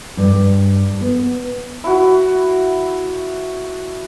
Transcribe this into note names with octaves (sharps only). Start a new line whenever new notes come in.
G2
B3
E4 F#4